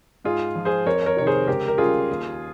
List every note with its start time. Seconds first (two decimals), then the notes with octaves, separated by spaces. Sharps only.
0.24 G#2 F4 G#4
0.55 F3
0.65 G#4 C5
0.86 F2 A#4 C#5
1.06 A#4 C#5
1.17 C3 D#3 C#5
1.27 G#4 C5
1.47 C#2 G4 A#4
1.68 A#4
1.78 C#3 G3 F4 G#4
2.10 D#2